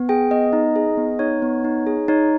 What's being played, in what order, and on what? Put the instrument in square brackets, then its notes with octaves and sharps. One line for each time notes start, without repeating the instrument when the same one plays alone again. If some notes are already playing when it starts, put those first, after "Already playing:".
Already playing: [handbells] B3
G#4 G5
B3 D#5
D#4
G#4
B3
D#4 C#5
B3
D#4
G#4
D#4 C#5